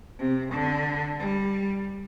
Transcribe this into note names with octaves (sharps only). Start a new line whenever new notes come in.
C3
D3
G3